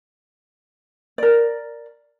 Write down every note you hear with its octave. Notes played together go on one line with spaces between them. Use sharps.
A#4 D5